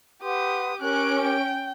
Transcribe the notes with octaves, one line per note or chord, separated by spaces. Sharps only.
G4 B4 F#5 C6 D#6
C#4 G4 A#4 F#6 D7
G5